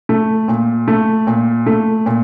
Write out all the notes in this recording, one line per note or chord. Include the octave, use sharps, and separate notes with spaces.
A3
A#2
A3
A#2
A3
A#2